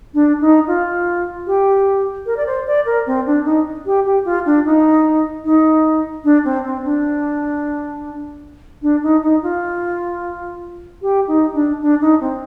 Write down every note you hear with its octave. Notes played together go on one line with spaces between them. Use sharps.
D4
D#4
F4
G4
A#4
D5
C5
D5
A#4
C4
D4
D#4
G4
G4
F4
D4
D#4
D#4
D4
C4
C4
D4
D4
D#4
D#4
F4
G4
D#4
D4
D4
D#4
C4